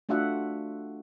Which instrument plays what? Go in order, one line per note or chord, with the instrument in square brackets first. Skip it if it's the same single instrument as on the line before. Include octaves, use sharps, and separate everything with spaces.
[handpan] A3 D4 F4 F#4 E5 F#5